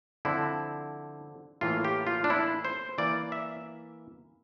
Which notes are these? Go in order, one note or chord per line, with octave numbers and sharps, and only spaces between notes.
D3 F3 C4 E4
A2 E3 A#3 F4
G4
F4
D4
E4
C5
E3 A#3 D5
E5